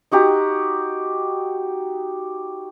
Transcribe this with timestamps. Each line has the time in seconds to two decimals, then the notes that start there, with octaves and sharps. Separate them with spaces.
0.12 D#4 F#4 G4 A#5